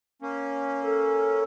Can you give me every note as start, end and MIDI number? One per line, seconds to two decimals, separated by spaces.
0.22 1.44 58
0.22 1.44 61
0.84 1.43 69